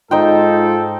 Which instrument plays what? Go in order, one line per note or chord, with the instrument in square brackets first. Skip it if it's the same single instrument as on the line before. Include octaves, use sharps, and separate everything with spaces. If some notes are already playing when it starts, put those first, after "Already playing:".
[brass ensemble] G#2 F4 A4 [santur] D#4 C5 G5